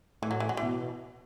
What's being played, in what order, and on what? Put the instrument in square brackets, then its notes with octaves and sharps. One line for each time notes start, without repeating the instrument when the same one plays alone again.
[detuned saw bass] A2 [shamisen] E3
[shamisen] F#3
E3
F#3
E3
[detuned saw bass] B2